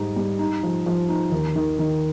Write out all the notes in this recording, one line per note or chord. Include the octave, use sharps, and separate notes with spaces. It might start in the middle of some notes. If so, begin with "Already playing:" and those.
Already playing: G#2 G3 D#4
G3
D#4
F3
F3
D#4
D#2
D#3
D#3